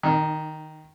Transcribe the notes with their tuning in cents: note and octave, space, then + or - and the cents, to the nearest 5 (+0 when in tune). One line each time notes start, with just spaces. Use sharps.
D#3 +0 D#4 -35